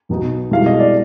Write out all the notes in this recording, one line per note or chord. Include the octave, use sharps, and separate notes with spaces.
B1 B2 B3 D#4
C2 B2 G#3 F5
D#5
D5